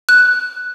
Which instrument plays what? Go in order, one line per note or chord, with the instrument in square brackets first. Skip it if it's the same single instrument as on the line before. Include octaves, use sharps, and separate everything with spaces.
[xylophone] F#6